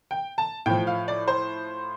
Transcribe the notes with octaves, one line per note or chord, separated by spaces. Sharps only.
G5
A5
A2 F3 G5
F5
D5
C5